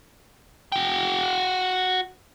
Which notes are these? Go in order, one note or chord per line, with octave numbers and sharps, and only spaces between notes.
F#4 G5